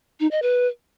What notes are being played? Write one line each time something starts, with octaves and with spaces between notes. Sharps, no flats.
D#4
D#5
B4